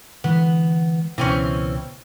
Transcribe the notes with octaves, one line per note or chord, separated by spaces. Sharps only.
D3 E3 G#3 B3
C#2 B2 E3 C4 C#4